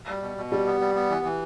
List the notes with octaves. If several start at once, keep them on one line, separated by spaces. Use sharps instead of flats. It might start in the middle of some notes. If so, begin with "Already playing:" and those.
Already playing: F#4
G3
B2
B2
G3 G4
B3
G3
B3
E3
E3